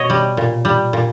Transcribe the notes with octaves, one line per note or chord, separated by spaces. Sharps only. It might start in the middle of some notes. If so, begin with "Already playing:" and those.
Already playing: B2 C#5 D#5
G3
A#2
G3
A#2